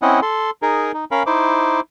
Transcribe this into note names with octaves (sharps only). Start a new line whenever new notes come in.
C4 C#4 E4 D#5 F#5
A4 C6
D#4 G#4 A#4
D#4
C#4 A#4 F5 B5
D#4 E4 C5 D6